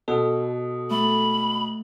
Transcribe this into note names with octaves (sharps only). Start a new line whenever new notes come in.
B2 A4
A3 B5